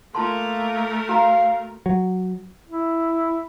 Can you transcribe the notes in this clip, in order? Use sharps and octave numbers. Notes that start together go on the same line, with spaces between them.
A3 A#3 F4 A#4 A5 C6
F#4 F5 A#5
F#3
E4